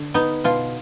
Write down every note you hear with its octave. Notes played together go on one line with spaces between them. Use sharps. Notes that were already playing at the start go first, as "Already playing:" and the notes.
Already playing: D3
B3 D#4
B2 F4